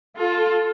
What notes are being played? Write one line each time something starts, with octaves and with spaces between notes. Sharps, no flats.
F4 A4